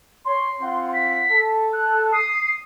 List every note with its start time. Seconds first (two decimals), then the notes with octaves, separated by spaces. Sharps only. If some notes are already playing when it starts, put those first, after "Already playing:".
0.25 C#5 C6
0.60 C4 F4 F#5
0.93 B6
1.29 A4
1.73 F#6
2.12 D#6 C7